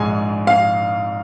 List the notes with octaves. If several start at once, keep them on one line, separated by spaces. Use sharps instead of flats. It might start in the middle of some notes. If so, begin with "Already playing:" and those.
Already playing: A#1 G#2 G#3 G#5
F5